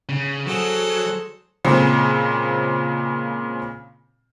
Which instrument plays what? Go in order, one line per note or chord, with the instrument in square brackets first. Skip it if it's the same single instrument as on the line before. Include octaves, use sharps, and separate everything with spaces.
[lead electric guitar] C#3
[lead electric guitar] F#3 [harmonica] G#4 A4 C5
[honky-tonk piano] A#2 C#3 G#3 C4